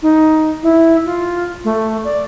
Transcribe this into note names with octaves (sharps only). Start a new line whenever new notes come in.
D#4
E4
F4
A3
D5